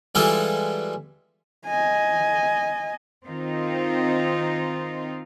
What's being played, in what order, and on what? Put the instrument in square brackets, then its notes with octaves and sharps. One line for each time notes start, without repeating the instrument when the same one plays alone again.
[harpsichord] E3 G3 G#3 E4 F4 A4
[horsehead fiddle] D#5 G#5
[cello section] D#3 C4 D#4 F4